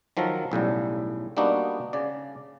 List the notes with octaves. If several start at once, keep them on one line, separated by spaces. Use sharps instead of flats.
D#3 F3 F#3 A4 A#4
B1 A2 C#3 G3
G3 A#3 B3 D4 D#4 F#4
C#3 D5